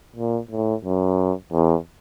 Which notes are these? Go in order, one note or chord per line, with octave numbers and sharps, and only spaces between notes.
A#2
A2
F#2
E2